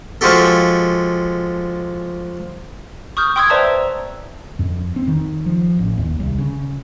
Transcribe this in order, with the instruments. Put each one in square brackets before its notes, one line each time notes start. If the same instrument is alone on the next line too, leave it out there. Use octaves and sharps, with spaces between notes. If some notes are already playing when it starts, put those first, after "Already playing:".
[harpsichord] F3 G#3 F#4 G4 A4
[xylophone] C#6 D#6 F6 G6
G5 C6 D#6 E6 G#6
B4 C5 D5 E5 A5 A#5
E6
[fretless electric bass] F2
C4
D#3
F3
A1
D#2
C2
C#3